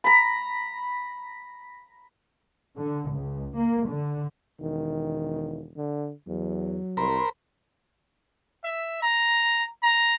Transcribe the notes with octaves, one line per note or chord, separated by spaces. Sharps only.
A#5 B5
D3
C#2
A#3
D3
E1 D#3
D3
E2 F#3
C2 A#4 C5 B5
E5
A#5
A#5